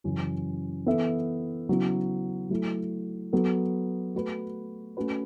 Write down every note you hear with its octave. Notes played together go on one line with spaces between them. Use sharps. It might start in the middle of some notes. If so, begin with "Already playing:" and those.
F#2 C#3 E3 C#4
E3 B3 A4 E5
C#3 F#3 B3 E4
F#3 A3 E4
F#3 B3 A4
A3 F#4 B4
A3 C#4 F#4 B4